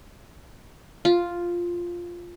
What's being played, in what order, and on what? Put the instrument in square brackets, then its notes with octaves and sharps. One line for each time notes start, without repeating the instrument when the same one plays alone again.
[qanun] F4